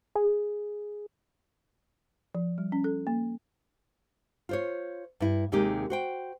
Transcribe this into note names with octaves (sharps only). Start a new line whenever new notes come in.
G#4
F3
G3
C#4
A4
A#3
F4 C5 C#5
G2 E4
D#2 C3 G#3 A#3 D#4 G4
F#4 C5 G5